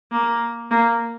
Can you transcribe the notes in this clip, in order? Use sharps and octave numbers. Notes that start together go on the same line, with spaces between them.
A#3
A#3